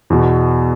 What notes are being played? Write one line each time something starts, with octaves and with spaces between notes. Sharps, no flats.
E2 B2